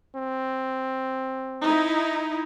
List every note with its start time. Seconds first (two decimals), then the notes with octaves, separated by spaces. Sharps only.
0.15 C4
1.61 D#4 E4